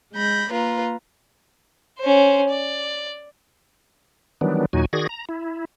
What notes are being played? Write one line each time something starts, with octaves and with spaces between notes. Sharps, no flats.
G#3 B5 G6 A#6
A#3 F4 B4 A#5
C#4 C5
D5
D#3 E3 F#3 G3 B3 D4
D#2 A#2 F#3 D#4 F#4 G#5
D#3 F#4 G#4 D5 G#6 A#6
A#5
E4